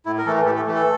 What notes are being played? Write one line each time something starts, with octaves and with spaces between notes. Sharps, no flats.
A2 E4
A#4
E3 A3 A4
A2 G4
A4
E3 A3
A4